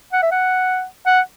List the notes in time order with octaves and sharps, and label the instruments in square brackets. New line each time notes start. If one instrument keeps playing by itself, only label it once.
[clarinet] F#5
E5
F#5
F#5